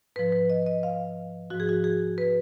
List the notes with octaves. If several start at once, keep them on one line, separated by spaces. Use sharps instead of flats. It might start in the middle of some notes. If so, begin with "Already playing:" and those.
G#2 F3 B4
B4
D#5
D#5
F5
G#2 F3 F#4
G#4
F#4
G#4
B4